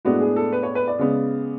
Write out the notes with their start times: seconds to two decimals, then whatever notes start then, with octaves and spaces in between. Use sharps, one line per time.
0.05 A2 G#3 B3 D4 F#4
0.21 G#4
0.36 A4
0.52 B4
0.63 C#5
0.75 B4
0.88 D5
0.99 C#3 G#3 B3